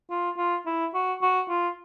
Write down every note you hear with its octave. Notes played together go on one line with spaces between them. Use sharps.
F4
F4
E4
F#4
F#4
F4